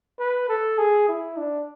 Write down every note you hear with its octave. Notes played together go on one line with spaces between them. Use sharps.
B4
A4
G#4
E4
D4